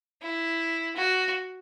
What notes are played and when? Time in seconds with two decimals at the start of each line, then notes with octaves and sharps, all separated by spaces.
0.22 E4
0.96 F#4